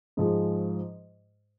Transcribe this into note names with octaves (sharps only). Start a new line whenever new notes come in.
G#2 F3 G#3